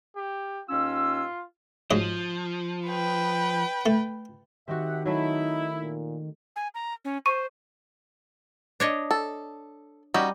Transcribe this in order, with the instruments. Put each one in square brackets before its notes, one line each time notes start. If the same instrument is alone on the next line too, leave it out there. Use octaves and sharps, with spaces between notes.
[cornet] G4
[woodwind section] D#2 C#4 E6 [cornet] F4
[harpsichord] G#2 F#3 D#5 [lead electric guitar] F3
[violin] B4 G5
[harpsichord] A3
[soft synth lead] D#3 [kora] C4 D#4 F#4 [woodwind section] G4 E5 F#5
[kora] F#3 A3 [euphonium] D#4 [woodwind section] E4
[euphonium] A#2
[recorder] G#5
A#5
C#4
[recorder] C5 [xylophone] C#6 D#7
[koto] D4 C#5 D#5
[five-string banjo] A4
[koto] G3 [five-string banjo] C#4 D#4 F#4